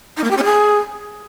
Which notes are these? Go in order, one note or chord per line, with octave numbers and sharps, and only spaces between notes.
D#4
A#3
G4
C#4
G#4